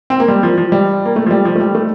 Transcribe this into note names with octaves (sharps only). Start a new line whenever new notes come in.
C4
A#3
G3
F3
F3
G3
A#3
A3
F3
G3
F3
A3
G3
A3